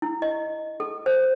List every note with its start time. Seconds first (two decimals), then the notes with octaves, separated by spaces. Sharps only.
0.02 E4
0.22 D#5
0.80 A4
1.06 C5